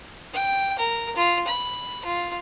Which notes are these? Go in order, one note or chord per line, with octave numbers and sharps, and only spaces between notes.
G5
A#4
F4
B5
F4